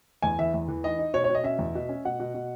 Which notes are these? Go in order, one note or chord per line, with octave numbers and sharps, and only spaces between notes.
E2 G#5
E3 E5
E2
E3
D#4 D#5
D#4
B2 C#5
C#5
B2
D#5
C#4 E5
E2
B2
C#4
B2 F#5
B2
B2